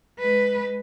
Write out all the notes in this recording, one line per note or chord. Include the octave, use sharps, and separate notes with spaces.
G#3 B4